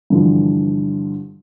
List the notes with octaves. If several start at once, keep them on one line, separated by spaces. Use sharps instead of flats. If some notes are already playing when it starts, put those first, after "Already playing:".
G2 D3 E3 F3